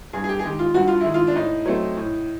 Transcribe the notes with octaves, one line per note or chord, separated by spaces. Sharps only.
G2 G#4
G#4
G4
G#4
D#3 G#3 G4
F4
G2 F#4
F4
D#3 G#3 E4
F4
D4
A2 D#4
F#3 A3 C4
A2